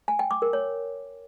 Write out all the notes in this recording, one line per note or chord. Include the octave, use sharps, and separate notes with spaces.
G#5
G5
D6
A#4
C#5